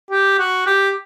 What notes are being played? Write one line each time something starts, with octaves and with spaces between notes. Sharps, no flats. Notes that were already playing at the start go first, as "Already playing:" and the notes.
G4
F#4
G4